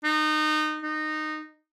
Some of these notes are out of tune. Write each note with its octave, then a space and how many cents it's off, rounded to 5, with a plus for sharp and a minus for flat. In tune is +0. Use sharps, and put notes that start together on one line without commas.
D#4 -25
D#4 -15